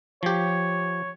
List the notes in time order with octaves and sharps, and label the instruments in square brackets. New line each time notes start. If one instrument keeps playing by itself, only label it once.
[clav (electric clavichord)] F3 G4 [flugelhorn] C#5